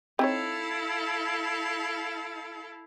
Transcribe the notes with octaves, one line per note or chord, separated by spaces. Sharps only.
C4 D#4 E4 A4 C#5 F5